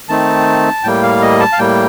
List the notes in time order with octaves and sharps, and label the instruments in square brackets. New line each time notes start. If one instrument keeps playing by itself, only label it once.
[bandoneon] D#3 A3 C4 D#4 A5
A2 G3 A#3 G5
F5
D#5
A5
F5
A2 G3 A#3 G5